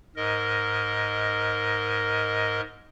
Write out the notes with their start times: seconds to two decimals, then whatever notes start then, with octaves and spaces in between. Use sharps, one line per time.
0.16 G#2 A#4 D#5